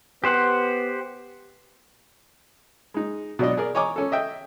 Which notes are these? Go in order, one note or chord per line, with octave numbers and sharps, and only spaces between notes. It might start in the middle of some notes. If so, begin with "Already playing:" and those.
B3 G4 C5 F#5
G#3 D#4
B2 F#3 D4 D#5
G#4 A#4 D5
C#5 D#5 G#5 A#5 D6
C#4 A4
D#5 E5 G5